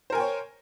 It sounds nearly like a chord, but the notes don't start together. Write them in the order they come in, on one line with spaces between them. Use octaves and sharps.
C5 A#4 G#5 G5 C#5